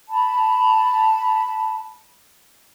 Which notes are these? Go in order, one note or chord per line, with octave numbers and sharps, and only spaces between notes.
A5 B5